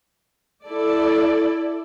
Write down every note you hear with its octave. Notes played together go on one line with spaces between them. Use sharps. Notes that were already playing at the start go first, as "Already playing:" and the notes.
E4 A4 D5